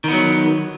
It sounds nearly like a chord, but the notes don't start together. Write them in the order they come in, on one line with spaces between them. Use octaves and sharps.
D#3 B3 F#3